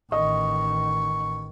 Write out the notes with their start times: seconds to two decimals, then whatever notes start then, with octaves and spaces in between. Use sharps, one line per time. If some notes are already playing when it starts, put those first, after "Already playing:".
0.12 A1 D#3 D#5 C#6